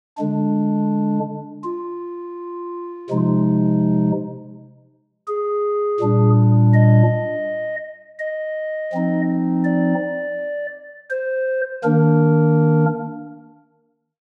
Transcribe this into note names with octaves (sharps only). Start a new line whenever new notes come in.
D3 G#3 D4
F4
C3 F3 G#3 D#4
G#4
A#2 G3 D4
D#5
D#5
F3 C4 D#4
D5
C5
D#3 A#3 D4 A#4